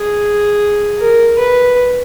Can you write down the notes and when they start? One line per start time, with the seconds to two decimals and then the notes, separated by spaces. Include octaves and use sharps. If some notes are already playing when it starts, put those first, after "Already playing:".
Already playing: G#4
1.00 A#4
1.39 B4